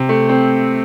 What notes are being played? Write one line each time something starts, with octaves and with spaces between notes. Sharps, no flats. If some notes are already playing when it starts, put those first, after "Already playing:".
Already playing: C3
A3
C4